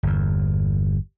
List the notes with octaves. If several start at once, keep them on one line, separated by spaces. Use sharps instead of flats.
G1 E2